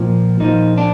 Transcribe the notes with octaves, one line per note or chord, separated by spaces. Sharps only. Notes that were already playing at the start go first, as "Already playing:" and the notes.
Already playing: A#2 F3
A#2 F3 D#4
D4